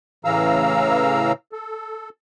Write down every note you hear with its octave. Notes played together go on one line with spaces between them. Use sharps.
A2 C#3 E3 F5 A#5 E6
A4